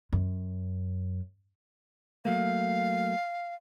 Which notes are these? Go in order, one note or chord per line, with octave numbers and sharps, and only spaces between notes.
F#2
F#3 A3 A#3 F5